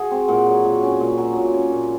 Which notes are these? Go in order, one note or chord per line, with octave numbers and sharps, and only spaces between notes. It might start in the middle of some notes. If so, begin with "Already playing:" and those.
Already playing: F#4 G#4
C4
A#2 F#5
F#3
A#2
C#4
A#2
F#3
A#2
C#4
A#2